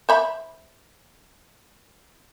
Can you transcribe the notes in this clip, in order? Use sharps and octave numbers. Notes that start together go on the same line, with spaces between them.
C5 E5 B5